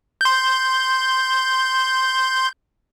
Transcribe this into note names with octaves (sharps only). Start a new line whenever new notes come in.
C6 G6